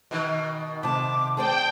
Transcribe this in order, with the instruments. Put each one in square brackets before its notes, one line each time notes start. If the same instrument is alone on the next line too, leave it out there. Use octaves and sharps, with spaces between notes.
[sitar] B2 D#3
[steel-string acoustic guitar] C3 A5 [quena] D6
[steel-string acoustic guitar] G#4 C5 D5 [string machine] G5 [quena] A5